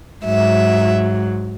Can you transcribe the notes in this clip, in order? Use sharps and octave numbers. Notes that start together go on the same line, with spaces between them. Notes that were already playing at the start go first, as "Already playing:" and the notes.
G#2 F#3 E5